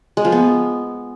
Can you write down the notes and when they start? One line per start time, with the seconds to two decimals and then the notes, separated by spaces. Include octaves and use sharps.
0.17 G#3
0.25 F3
0.32 B3